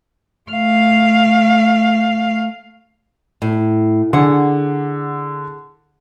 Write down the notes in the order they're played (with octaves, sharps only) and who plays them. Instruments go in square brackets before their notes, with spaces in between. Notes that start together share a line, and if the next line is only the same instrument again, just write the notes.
[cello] A3 F5
[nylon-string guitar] A2
[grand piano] D3 [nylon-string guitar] G#4 F#5